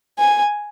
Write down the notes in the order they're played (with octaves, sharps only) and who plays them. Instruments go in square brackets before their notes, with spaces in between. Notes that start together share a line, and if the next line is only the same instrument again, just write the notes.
[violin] G#5